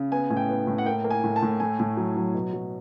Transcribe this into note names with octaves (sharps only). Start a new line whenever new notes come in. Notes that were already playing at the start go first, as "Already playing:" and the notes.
Already playing: C#3
B3 G#5
A2 G#5
G5
B3
A2
F#5
A#3 G5
A#3
G#5
A2
A5
A2
A3 G#5
A2
F#3
F#3
B2
F#3